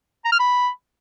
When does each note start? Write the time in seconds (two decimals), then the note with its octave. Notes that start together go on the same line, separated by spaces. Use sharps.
0.25 A#5
0.32 F6
0.39 B5